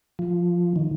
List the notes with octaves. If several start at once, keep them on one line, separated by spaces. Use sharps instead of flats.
F3
D#3